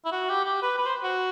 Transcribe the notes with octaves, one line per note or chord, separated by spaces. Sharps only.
E4
F#4
G4
G4
B4
B4
C5
F#4